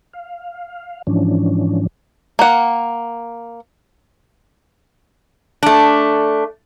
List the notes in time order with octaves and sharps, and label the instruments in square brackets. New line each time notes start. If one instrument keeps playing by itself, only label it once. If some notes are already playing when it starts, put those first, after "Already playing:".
[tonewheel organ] F5
G#2 E3 F3 C#4 D4
[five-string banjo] A#3 F#5
[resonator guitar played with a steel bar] A3 D4